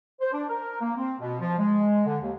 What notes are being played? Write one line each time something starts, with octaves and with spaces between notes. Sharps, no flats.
C5
D4
A#4
A#3
C4
B2
F3
G#3
D3
D#2